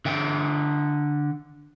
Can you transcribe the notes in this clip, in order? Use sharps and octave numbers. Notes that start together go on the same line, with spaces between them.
D3 E5 G5